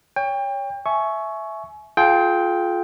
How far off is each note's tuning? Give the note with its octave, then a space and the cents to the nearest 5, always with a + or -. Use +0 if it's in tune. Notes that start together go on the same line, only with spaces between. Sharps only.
C#5 +20 G5 +30
E5 +0 G#5 +30 C#6 +0
F4 +0 G#4 +40 G5 +0